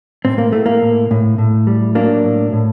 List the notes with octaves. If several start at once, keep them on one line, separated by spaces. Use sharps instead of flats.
A2 C4
A#3
A2 A3
A#3
A2
A2
A2
G3
F#3 A#3 D4
A2
A2